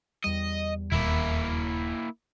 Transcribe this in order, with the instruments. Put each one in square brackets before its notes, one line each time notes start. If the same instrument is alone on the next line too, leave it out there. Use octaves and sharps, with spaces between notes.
[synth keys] E2 G3 [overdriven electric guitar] D#5
[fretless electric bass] D#1 [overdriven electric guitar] A#3 E4